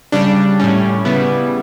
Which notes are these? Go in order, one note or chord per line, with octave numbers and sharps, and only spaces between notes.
C#3 G3 D4
A2 G3 C#4
C#3 G3 B3 E4